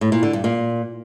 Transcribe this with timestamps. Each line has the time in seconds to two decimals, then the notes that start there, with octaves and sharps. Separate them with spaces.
0.01 A2
0.12 A#2
0.23 D3
0.33 G2
0.44 A#2